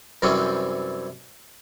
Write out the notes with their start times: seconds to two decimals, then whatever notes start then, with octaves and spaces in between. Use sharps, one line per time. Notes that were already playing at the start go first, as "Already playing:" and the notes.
0.22 F#2 C3 E3 G3 C4 C#4